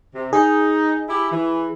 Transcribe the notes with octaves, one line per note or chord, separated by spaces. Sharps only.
C3
D#4 G#4
E4 G4
E3